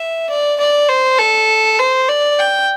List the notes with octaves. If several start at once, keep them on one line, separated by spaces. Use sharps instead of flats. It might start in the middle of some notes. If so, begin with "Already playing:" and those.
Already playing: E5
D5
D5
C5
A4
C5
D5
G5